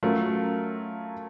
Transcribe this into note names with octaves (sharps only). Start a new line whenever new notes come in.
F#3 A3 C#4 F4 A#4